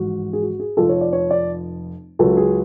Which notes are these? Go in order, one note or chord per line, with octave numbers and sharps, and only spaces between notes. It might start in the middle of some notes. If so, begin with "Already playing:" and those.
Already playing: A1 G#2 F3 F#4
G#4
F#4
G#4
F1 F2 F3 A4
C#5
D5
C#5
D5
C#2 C#3 F#3 A4
G#4